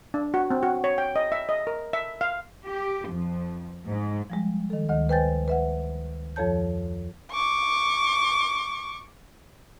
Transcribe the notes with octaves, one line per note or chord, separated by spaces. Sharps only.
D4
F#4
C4
F#4
C#5
G5
D#5
E5
D#5
A#4
E5
F5
G4
F2
G#2
F3 G3 G#3
D#3 A4
D2 D#3 D#5
B4 C5 G5 G#5 G6 A6
B4 E5 F#5
F2 F3 A4 C#5 A5 G6
C#6 D6